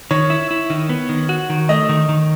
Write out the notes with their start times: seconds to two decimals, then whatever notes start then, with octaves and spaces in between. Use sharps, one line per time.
0.11 D#3 C#5
0.30 E4
0.51 E4
0.70 D#3
0.89 B3
1.09 D#3
1.29 F#4
1.50 D#3
1.69 A3 D#5
1.89 D#3
2.09 D#3